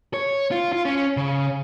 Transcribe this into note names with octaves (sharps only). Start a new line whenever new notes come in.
C#5
F4
F4
C#4
C#3